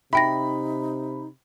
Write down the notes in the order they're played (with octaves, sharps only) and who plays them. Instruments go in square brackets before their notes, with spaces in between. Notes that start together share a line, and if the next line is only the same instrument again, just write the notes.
[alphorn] C3 [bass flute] D#4 [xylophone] E5 G5 A#6 [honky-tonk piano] B5